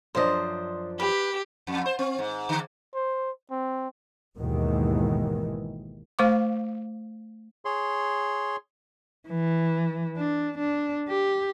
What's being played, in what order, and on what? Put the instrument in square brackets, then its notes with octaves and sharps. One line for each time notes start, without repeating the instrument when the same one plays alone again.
[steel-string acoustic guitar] F#2 F3 D4 [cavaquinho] C5 D#5
[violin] G4 [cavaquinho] B4
[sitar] F2
C5
C4
G#2
D3
[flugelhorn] C5
C4
[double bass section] G#1 D#2 B2 D#3 E3 G#3
[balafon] A3 C5 F5 C#6 D6
[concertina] G#4 C#5 C6
[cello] E3
D4
D4
G4